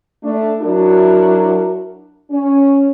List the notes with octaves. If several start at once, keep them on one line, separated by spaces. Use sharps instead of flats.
A3 D4
F#3 D4 E4 F#4 A#4
C#4